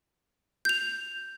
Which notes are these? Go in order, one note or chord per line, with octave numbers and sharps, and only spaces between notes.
G6 F7